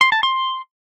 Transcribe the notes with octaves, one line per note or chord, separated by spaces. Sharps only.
C6
A5
C6